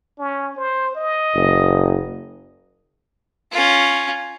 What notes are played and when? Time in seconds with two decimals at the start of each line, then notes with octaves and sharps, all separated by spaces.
0.19 C#4
0.57 C5
0.95 D#5
1.35 F#1
3.52 C#4 F4